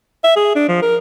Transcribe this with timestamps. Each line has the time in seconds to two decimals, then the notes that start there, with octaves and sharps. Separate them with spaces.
0.24 E5
0.36 G#4
0.55 D4
0.68 F3
0.82 A#4